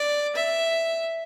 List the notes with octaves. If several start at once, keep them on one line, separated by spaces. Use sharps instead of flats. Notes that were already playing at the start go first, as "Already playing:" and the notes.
Already playing: D5
E5